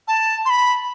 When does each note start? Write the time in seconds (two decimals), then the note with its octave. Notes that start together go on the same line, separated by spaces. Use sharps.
0.08 A5
0.45 C6
0.50 B5